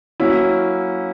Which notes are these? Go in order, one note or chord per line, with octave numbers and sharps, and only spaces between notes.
F#3 A#3 C#4 E4